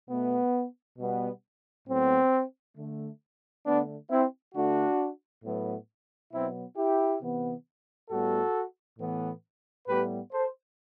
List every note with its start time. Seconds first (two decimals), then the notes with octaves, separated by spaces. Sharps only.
0.10 B2 A3 B3
0.99 B2 G3 B3
1.88 A2 F#3 B3 C4
2.77 D3 A3
3.66 D3 A3 B3 D4
4.10 C4 E4
4.54 D3 A3 D4 F#4
5.44 A2 F#3 B3
6.33 B2 F#3 B3 C4 E4
6.77 E4 G4
7.22 C3 E3 B3
8.10 A2 G3 B3 F#4 A4
8.99 A2 E3 B3
9.88 A2 G3 B3 G4 B4
10.32 A4 C5